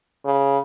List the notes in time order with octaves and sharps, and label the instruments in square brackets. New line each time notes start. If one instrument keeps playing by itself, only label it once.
[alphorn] C#3